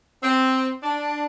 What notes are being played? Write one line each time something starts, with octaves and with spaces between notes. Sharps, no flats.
C4
D4